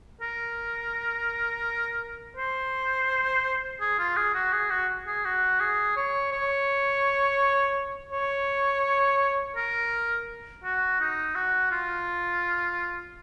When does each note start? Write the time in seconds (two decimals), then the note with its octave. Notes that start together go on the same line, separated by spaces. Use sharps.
0.21 A#4
2.37 C5
3.81 G#4
3.99 F4
4.17 G#4
4.34 F#4
4.53 G#4
4.70 F#4
5.07 G#4
5.25 F#4
5.60 G#4
5.97 C#5
6.32 C#5
8.12 C#5
9.56 A#4
10.64 F#4
11.01 D#4
11.36 F#4
11.72 F4